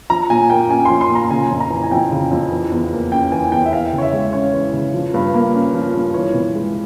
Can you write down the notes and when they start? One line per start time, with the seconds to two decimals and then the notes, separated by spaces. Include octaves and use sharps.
0.10 F3 A#5
0.30 A#2 G#5
0.50 A#3 G5
0.70 C#4 G#5
0.85 C6
0.90 F3
1.01 C6
1.10 A#2 A#5
1.31 C#3 G#5
1.51 F2
1.60 A#5
1.70 E3
1.84 G#5
1.91 F2 G5
2.12 C#3
2.32 F2
2.52 E3
2.72 E2
2.92 A#3
3.12 C#4 G5
3.32 E3 G#5
3.52 E2 G5
3.66 E5
3.73 E3 F5
3.93 C#3
3.98 C#5
4.02 E5
4.13 G#3
4.33 C#4 C#5
4.53 E3
4.73 C#3
4.94 F3
5.14 G2
5.34 A#3
5.55 C#4
5.74 F3
5.95 G2
6.14 E3 C#5
6.34 C3
6.55 G#3